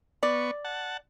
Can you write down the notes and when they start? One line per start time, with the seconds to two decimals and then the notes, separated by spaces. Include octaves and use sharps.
0.23 B3 D5 C#6
0.65 F#5 A5